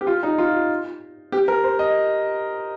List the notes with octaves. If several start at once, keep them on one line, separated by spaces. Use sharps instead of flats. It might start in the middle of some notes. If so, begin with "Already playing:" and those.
G4
F4
D#4
F4
G4
A#4
C5
D#5